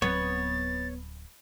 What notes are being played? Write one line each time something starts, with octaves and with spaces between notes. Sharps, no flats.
D1 F#3 B3 C4 C#5 A6